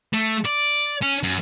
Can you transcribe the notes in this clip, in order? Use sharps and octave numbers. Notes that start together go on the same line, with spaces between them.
A3
D5
C#4
F#2